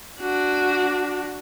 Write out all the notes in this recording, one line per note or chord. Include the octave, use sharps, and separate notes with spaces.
D4 F#4